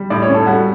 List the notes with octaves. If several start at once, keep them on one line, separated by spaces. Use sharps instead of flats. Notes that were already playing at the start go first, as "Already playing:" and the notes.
Already playing: G3
A2 D5
C#5
C#4
A4
G3 F#4